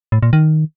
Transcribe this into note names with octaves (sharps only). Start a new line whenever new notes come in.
A2
A#2
D#3